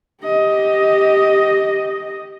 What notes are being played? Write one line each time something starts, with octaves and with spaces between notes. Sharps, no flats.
G4 D#5